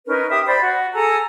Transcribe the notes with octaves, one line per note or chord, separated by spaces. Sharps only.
C#4 D#4 A#4 B4
G4 E5 D#6
C5 D5 B5
F#4
G#4 A4 G#5 A#5